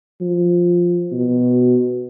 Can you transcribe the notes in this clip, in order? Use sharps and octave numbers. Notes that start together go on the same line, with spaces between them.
F3
B2